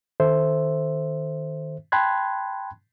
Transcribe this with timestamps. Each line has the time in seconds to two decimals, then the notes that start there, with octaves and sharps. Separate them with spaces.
0.20 D#3 A4 C5 E5
1.92 G5 A5 B5 C6 F#6 G#6